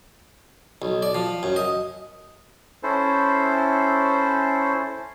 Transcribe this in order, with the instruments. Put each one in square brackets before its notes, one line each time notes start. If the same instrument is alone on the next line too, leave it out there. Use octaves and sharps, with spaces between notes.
[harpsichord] B1
D5
F3
F#2
D#5
[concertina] C#4 E4 A4 C5